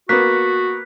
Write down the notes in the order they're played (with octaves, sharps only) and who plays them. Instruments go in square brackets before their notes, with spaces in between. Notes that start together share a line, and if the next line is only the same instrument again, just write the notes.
[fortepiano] A#3 B3 [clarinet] F#4 [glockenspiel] F#6 B6